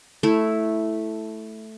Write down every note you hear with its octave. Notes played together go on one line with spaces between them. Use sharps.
A3 E4